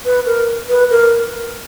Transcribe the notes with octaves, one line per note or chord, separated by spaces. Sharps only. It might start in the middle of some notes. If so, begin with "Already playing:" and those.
B4
A#4
B4
A#4